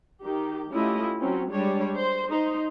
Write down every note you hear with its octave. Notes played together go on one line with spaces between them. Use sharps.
D#3 G4
A3 C#4 E4 F4 G4 D#5
F#3 C4 C#4
G3 G#3 D4 C#5
C5
D#4 C5